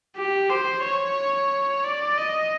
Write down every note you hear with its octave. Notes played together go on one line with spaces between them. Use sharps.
G4
C5
C#5
D5
D#5